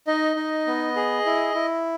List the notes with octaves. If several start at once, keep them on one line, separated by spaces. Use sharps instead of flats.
D#4 D#5
D#4
B3
G#4
E4
E4